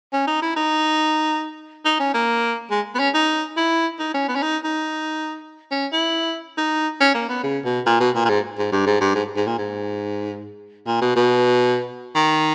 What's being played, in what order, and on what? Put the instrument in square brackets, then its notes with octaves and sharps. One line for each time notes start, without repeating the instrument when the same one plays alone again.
[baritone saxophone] C#4
D#4
E4
D#4
D#4
C#4
A#3
G#3
B3
C#4
D#4
E4
D#4
C#4
B3
C#4
D#4
D#4
C#4
E4
D#4
C#4
A#3
B3
C#3
B2
A#2
B2
A#2
A#2
G#2
G#2
G2
G#2
G2
G#2
G#2
A#2
G#2
A#2
B2
B2
D#3